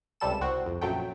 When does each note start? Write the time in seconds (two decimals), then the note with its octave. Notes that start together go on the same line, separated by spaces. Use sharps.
0.20 C#2 C3 G3 A4 E7
0.41 C2 C4 F#4
0.66 F2
0.81 A#1 F#2 F#3 A3 G5